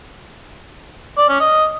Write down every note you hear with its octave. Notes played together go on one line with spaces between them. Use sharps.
D5
C#4
D#5